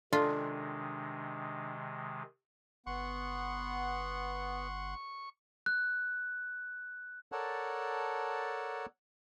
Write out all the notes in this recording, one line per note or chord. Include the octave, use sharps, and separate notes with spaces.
C3 D#3 G#3 D4 F4 A4
G1 B3 F#5 C6 C#6
F#6
A4 A#4 C#5 D5 F#5 A5